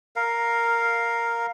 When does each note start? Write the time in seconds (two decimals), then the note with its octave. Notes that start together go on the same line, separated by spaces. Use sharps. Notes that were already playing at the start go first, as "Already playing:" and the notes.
0.16 A#4 F5